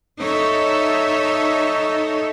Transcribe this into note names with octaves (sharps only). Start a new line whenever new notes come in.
D#4 A4 C#5 E5